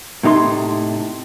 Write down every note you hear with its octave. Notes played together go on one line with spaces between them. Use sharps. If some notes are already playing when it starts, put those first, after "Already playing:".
A2 C3 D#4 C#5 C6